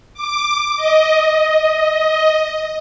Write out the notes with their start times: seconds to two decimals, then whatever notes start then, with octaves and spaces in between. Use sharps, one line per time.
0.14 D6
0.77 D#5